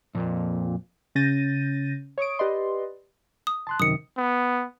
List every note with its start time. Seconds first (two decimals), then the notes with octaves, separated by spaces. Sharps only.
0.15 F2 A#2
1.15 C#3 C#4 G6 A6 A#6 D#7
2.18 C#5 C#6 D#6 D7
2.39 G4 B4 D5 D#5 C6
3.47 D#6
3.67 A5 C6 F#6
3.80 F#2 C3 D#3 D#6 C#7
4.17 B3